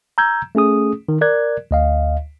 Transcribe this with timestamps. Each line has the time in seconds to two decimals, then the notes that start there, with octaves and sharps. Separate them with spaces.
0.18 A#5 E6 G6 G#6
0.55 A3 C#4 G#4 D#6
1.09 D#3
1.21 A#4 D5 F#6 G#6
1.71 D2 D#5 F5